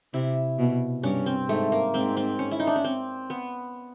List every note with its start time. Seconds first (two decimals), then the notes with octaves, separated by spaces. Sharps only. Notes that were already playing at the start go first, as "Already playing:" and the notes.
0.14 C3 E4
0.58 B2
1.03 G2 C#4
1.26 C4
1.48 G#2 A3
1.72 A#3
1.94 G#2 C4
2.17 C4
2.39 C#4
2.51 E4
2.60 D#4
2.67 D4
2.76 C#4
2.84 C4
3.30 B3